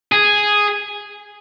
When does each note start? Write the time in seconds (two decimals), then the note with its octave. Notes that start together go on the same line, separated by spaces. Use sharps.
0.12 G#4